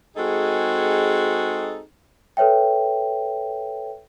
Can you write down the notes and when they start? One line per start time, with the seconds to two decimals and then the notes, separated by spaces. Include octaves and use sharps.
0.16 G#3 C4 D#4 F#4 G#4 A4
2.37 A4 B4 C#5 E5 G5